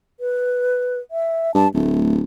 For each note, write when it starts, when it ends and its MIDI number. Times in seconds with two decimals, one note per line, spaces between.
0.20 0.99 71
1.11 1.54 76
1.55 1.67 43
1.55 1.68 81
1.74 2.22 26
1.74 2.14 57